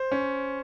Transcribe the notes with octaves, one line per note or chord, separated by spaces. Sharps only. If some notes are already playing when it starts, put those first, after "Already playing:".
Already playing: C5
C#4